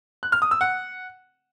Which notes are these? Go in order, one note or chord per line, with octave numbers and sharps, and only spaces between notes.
F#6
F6
D#6
E6
F#5